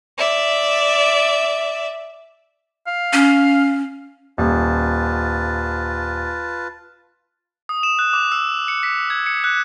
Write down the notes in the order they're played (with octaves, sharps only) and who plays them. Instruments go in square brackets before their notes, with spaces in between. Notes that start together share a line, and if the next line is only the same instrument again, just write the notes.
[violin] D5 E5
[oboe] F5
[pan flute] C#4
[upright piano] D#1 [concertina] F4 B4 A5
[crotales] D#6
E7
F#6
D6
E6
C#7
B6
G#6
C#7
F#6